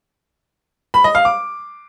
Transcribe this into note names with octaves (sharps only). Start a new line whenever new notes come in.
B5
D#5
F5
D6